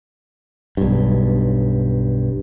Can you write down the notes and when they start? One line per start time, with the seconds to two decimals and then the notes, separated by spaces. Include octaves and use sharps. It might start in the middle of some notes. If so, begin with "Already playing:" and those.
0.77 B1 G2